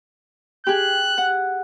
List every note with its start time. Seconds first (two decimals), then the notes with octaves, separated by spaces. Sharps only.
0.67 G4 G#4 F#6
1.18 F#5